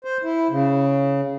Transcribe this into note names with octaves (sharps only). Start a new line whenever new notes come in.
C5
E4
C#3